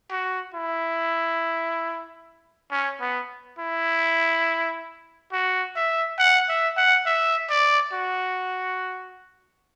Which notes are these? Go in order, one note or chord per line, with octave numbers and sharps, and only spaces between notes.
F#4
E4
C#4
B3
E4
F#4
E5
F#5
E5
F#5
E5
D5
F#4